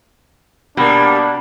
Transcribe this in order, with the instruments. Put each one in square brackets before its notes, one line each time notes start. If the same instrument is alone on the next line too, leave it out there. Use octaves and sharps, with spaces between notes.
[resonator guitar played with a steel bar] B2 [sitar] G3 A#3 [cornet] D4 [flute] B5